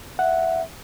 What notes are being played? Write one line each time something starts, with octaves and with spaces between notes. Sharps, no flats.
E5 F#5